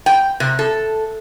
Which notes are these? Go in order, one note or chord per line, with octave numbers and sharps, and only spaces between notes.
G5
C3
A4